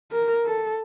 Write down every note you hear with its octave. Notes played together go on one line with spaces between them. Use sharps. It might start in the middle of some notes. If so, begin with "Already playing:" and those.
A#4
A4